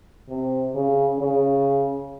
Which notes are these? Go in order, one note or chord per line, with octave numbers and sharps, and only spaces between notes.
C3
C#3
C#3